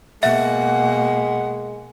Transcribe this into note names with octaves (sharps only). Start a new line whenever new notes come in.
B2 G#3 A#3 E5 F#5